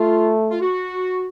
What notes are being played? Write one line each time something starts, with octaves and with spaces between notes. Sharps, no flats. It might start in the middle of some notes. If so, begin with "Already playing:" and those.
Already playing: A3 F4
F4
F#4